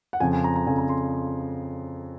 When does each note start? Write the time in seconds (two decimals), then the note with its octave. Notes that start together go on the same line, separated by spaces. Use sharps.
0.13 F#5
0.20 F2 C#3 F3 G#5
0.33 G#5
0.44 A#5
0.56 A#5
0.67 F2 C#3 F3 G#5
0.78 A#5
0.89 C6